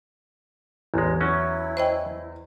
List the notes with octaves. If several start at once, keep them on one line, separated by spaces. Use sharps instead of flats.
A1 E2 G#3
F#3 C#4 E4
C5 D#5 G5